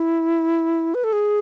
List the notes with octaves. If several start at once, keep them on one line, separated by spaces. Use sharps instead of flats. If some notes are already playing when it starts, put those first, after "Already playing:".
Already playing: E4
B4
A4
G#4